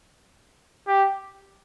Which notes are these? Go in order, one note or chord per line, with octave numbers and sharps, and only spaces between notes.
G4